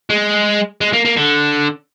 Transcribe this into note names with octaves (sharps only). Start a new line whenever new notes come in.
G#3
G#3
A#3
A#3
D3